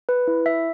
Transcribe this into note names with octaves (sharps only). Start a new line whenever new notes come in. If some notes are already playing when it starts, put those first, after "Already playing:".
B4
E4
E5